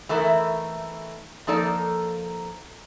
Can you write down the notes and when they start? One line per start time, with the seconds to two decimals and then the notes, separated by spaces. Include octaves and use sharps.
0.09 E3 A3 D#4 E4 A#4
1.47 F3 A#3 D#4 A4 D5